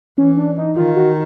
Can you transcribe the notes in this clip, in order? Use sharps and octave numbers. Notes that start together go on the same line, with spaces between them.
E3 C#4
D4
D#4
D#3 F4
F#4